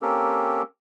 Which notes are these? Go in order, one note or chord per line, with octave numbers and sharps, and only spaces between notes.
A#3 C4 C#4 G4 A4 A#4